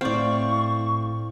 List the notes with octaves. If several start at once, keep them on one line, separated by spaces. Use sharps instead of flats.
A2 C4 D5 F5 C#6